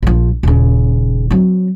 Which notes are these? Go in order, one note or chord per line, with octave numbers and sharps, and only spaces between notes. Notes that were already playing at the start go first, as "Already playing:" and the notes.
A#1 F3
D#1 C#3
F#3 C4